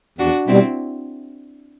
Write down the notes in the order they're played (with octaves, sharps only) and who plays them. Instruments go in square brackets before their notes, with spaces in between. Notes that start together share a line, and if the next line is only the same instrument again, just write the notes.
[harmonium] E2 [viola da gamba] D4 F#4
[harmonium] B2 G3 [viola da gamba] C4 E4